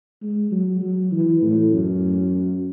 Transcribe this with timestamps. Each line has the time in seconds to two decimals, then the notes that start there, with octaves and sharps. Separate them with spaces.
0.22 G#3
0.51 F#3
0.81 F#3
1.11 E3
1.42 A2
1.71 F#2